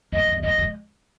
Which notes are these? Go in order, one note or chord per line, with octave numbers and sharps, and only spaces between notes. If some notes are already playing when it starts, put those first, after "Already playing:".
A#3 D#5
C4
G#3
A#3 D#5
G#3